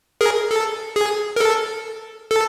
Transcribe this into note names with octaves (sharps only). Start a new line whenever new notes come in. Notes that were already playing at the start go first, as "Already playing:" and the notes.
G#4 A#4
A4
G#4
A#4
A4
A4